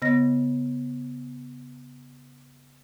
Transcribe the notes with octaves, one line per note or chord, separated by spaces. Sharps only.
C#3 B3 D#5 A#6